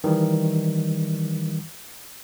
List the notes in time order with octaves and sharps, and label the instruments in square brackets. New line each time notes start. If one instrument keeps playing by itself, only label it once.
[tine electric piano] D#3 E3 G3